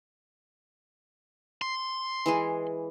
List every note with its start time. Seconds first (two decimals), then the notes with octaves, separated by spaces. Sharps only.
1.62 C6
2.26 E3 G#3 G#4